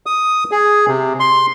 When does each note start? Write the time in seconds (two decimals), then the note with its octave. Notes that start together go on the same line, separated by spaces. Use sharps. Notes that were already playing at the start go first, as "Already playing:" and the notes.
0.06 D#6
0.51 G#4
0.88 C3
1.20 C6